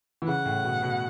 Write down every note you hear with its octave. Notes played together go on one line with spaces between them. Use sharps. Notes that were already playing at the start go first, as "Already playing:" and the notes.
E3
C#3 F#5
A2
B2
B2